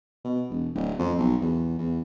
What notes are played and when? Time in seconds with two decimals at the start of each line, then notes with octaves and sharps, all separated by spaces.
0.25 B2
0.49 E1
0.75 D1
0.99 F2
1.19 B1
1.41 E2
1.79 E2